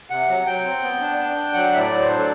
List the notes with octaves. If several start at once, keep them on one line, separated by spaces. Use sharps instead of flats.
C3 F#5
F#3
F#3 G5
C4
B3
D4
D4
D4
F#3 F#5
A2 E5
D5
F#3
C5
D4
A4